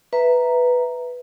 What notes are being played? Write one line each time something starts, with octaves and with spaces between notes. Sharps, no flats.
B4 E5 A#5